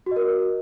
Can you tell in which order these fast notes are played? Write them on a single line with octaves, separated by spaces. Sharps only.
F#4 D#5 A#4